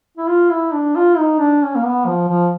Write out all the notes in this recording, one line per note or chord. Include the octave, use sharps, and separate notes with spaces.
E4
F4
E4
D4
F4
D#4
D4
C#4
A#3
B3
F3
F3